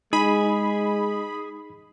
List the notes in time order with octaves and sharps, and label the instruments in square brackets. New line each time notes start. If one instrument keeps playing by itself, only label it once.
[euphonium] G#3 [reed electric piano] D#4 [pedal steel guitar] G#4 [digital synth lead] B5